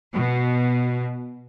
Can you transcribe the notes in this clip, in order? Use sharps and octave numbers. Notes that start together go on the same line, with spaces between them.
B2